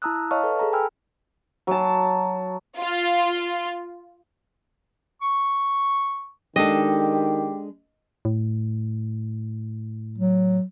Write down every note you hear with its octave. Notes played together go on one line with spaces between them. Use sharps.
E4 A5 A#5 D#6 E6 F#6
A#5
C#5 D#5 F5 A5 C#6 F6
A4 B4
G#4 A4 A5 A#5
G5 G#5 B5 E6 F6
F#3 A5
F4
C#6
D#3 G#3 D4 G4 A4 D#5
A2
F#3